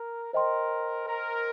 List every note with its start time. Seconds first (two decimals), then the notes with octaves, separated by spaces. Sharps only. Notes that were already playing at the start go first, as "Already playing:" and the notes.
Already playing: A#4
0.33 A#4 C5 D#5 G5 C6
1.07 A#4